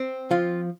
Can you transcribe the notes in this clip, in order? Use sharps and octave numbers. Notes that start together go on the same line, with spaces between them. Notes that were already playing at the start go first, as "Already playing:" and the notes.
Already playing: C4
F3 F4